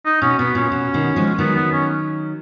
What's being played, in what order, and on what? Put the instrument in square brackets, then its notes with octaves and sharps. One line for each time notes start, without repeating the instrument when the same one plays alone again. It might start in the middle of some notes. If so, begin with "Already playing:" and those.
[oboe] D#4
[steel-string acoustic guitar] B2 [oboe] C#4
[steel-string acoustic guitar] B2 [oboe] B3
[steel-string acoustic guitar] A#2 [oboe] C#4
[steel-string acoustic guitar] B2
B2 D#3
F3 G#3
[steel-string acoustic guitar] D#3 F#3 [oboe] B3
[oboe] B3
C#4